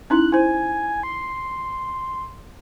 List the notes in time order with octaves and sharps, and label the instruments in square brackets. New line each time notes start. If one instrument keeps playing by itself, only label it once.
[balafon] C#4 D#4 E4 [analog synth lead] F#6
[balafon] E4 C5 [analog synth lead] G#5
[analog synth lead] C6